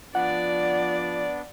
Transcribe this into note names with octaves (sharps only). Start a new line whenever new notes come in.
F3 B3 D4 D5 F#5